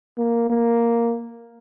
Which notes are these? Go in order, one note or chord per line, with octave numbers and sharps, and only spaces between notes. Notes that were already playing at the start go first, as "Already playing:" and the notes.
A#3
A#3